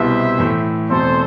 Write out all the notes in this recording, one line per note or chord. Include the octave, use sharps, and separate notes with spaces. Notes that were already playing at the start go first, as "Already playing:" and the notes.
Already playing: C2 B2 G3 B3 E4 C5 E5
A2 E3 A3 E4
E2 B2 A3 C4 A4 C5